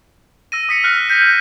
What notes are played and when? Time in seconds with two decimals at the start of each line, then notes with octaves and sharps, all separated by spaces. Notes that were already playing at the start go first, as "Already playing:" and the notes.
0.52 E6 A#6 D#7
0.69 D#6 B6 C#7
0.84 F6 F#6 A#6
1.09 G6 A#6 B6 D#7